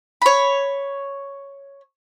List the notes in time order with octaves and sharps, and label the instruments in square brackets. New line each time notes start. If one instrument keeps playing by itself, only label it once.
[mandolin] C#5 B5